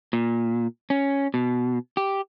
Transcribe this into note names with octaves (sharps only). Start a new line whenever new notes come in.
A#2
C#4
B2
G4